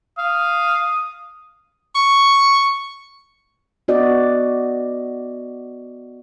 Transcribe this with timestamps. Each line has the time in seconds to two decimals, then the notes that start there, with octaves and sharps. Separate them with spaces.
0.18 F5 D#6
1.95 C#6
3.88 B3 F#4 D5 D#5